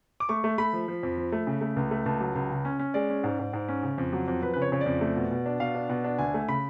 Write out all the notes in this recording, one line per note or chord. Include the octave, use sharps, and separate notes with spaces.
D6
A3 C#6
A3
A3 B5
F3
F3
F2
F3
A3
C#3
A3
C#2
A3
C#2 A5
F#3
C#2
C#3
C#4
C#4
G#3 D5
C#4
G#2
G#2
G#2
C#4
C#3
F2
F#3
F2
F2 B4
C#3 B4
C#5
C#3 C#5
D5
F2
A3
B2
B2
D4
B2 F5
D4
B2 F#5
D4
D2 G#5
A3
C#3 B5